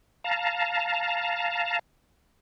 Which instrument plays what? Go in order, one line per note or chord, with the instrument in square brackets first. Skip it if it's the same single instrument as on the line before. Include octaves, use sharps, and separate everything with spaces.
[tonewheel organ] F5 A5 A#5